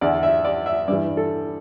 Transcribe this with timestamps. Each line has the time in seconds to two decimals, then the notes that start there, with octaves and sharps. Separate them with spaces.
0.01 E2 D3 D5
0.23 E5
0.45 D5
0.66 E5
0.88 G2 E3 D5
1.17 A4